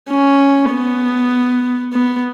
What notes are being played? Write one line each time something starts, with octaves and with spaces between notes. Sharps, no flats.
C#4
B3
B3